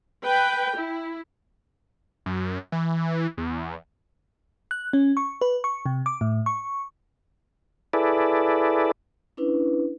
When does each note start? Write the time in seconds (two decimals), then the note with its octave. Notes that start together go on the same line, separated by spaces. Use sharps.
0.23 B4 G5
0.78 E4
2.26 F#2
2.72 E3
3.38 E2
4.71 F#6
4.93 C#4
5.17 C#6
5.41 B4
5.64 C#6
5.86 C3
6.06 D6
6.21 A2
6.46 C#6
7.93 E4 G#4 A4 B4 D5
9.37 C#4 D4 E4 B4